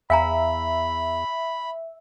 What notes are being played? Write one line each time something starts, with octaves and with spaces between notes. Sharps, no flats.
E2 E5 F5 G#5 A#5 B5